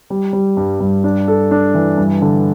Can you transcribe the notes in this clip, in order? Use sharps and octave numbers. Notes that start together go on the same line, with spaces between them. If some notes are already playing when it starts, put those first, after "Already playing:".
G3
G3
G2
G2
D4
A4
D4
E3
G2
D3